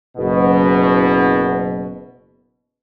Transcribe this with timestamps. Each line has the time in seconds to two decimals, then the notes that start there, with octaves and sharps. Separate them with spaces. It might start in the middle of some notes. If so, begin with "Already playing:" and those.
0.17 F#1 B2